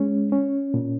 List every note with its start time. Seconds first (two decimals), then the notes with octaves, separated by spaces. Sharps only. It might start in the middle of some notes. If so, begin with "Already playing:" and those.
Already playing: G#3 C#4
0.32 C#4
0.74 A#2